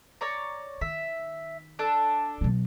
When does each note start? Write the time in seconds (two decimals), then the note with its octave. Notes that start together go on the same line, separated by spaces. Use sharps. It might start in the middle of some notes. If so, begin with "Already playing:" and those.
0.21 C#5 D5 A#5
0.81 D#3 E5
1.79 D4 A4 F#6
2.41 B2 F#3